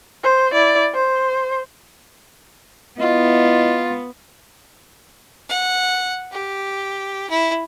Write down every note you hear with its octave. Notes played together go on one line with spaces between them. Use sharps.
C5
E4 D5
C5
B3 E4 F4 D#5
F#5
G4
E4